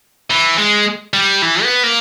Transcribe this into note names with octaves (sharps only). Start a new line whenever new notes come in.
E3
G#3
G3
E3
B3
A#3